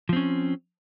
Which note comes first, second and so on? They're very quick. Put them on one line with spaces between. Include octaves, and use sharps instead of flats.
F3 C4 C#4